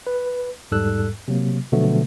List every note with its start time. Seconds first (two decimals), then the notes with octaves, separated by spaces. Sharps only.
0.07 B4
0.71 E2 G#2 G3 A4 E6 F#6
1.28 C3 F#3 A#3
1.72 B2 D3 F3 F#3 A3 B3